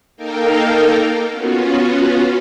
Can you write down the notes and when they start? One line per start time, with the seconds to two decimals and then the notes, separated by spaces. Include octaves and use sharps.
0.17 A#3 D#4 A4 A#4 F5 G5
1.30 B3 C#4 F4 F#4